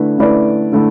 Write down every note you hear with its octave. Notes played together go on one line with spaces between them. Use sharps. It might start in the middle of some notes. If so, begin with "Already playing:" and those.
Already playing: D3 A3 E4 B4
D3 A3 E4 B4 D5
D3 A3 E4